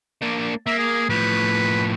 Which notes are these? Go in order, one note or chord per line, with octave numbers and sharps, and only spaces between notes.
A#3 D4
A#3 E5
G#4
A2 F3 B4